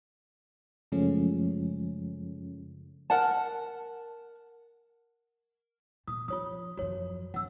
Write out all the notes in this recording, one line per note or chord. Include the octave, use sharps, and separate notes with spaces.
F#2 C#3 F3 G#3 A3 C#4
A#4 F#5 A5
A#2 D#6
F3 F4 C#5 D#6
F#2 F3 F#4 C#5
F#2 F#5 E6